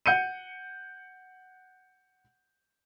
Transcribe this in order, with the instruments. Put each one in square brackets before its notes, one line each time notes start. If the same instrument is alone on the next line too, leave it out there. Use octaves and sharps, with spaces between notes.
[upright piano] F#5 G6 C#7 D#7